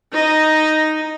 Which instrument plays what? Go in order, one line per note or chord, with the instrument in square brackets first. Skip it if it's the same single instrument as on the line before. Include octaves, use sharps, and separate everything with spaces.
[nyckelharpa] D#4 D#5